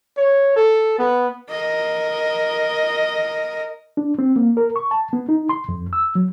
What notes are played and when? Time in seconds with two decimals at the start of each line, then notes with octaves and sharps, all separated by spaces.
0.18 C#5
0.57 A4
0.99 B3
1.50 A#4 D#5
3.97 D4
4.19 C4
4.36 A#3
4.57 A#4
4.76 C#6
4.91 A5
5.13 B3
5.29 D#4
5.49 C6
5.69 F2
5.93 E6
6.15 F#3